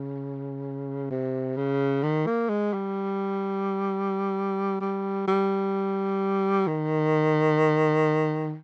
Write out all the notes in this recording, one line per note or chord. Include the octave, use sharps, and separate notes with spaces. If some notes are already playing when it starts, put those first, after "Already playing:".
Already playing: C#3
C3
C#3
D#3
A#3
G#3
G3
G3
G3
D#3